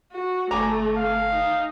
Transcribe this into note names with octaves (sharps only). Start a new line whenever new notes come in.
F#4
G1 A3 G#5 A#5 D6
F5
D#4